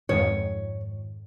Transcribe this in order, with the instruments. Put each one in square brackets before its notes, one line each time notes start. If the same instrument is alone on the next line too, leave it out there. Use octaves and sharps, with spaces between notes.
[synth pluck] F2 G#2 D#3 [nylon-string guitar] C#5